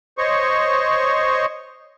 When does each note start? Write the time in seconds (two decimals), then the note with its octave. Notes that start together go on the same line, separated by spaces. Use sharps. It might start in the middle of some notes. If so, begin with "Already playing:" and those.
0.18 C5 C#5 D#5 C#6